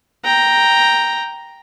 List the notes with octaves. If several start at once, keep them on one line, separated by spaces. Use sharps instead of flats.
G5 A#5